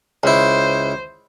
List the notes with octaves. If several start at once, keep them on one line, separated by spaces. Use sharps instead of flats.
C#2 E4 C5